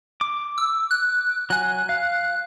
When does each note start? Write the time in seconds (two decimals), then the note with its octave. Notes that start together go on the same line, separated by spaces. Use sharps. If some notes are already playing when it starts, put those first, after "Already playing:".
0.21 D6
0.58 E6
0.91 F#6
1.50 F#3 G#5 F#6
1.89 F5